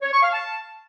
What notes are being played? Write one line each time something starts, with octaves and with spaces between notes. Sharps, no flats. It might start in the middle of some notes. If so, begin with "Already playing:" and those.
C#5
C#6
F5
A5